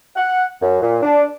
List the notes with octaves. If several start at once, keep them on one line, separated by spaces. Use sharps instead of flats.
F#5
F#2
A#2
D4